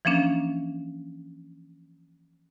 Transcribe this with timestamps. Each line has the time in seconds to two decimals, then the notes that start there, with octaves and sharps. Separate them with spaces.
0.05 E3 F3 A#3 C#4 D4